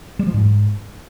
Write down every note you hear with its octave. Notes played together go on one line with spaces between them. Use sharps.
G3
F3
G#2